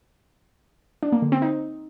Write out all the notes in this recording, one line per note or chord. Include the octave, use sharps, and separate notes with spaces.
D4
A#3
D3
C4
D#4